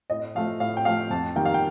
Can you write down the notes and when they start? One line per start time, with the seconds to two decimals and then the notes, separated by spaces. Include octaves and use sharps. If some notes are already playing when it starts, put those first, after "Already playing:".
0.10 A2 D#5
0.35 F3 A3 F5
0.60 A2 F5
0.77 G5
0.85 F3 A3 F5
1.10 F2 A5
1.36 D#3 G3 A#3 G5
1.45 F5
1.54 G5